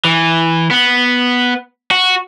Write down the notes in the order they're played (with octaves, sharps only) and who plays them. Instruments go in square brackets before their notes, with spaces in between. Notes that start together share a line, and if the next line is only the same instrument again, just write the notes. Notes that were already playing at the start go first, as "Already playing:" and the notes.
[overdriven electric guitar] E3
B3
F#4